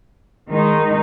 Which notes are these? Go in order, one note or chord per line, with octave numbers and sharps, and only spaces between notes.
D#3 G#3 D#4